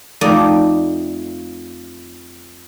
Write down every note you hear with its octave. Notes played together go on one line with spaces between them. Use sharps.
F2 A3 D#4 D5